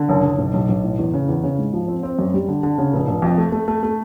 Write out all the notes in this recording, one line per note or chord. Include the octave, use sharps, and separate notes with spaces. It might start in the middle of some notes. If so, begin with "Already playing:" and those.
Already playing: D3
F#1
F#1
B1
B1
B1
A2
E2
C#3
E2
C#3
G#2
F3
C4
C4
F#2
G3
D3
D3
C#3
F1
F1
F2
A3
A3
A3
A3